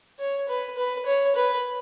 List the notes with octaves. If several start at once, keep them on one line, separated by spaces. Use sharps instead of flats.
C#5
B4
B4
C#5
B4